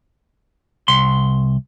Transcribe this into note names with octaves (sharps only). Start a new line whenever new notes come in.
C2 C6